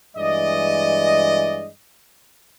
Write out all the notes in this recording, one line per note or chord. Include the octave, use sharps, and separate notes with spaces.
G2 E3 G#3 D5 D#5